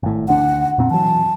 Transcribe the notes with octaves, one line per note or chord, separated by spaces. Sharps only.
G#1 A2
D2 D3 D4 F#5
F2 A#2 C4
E3 F#3 A5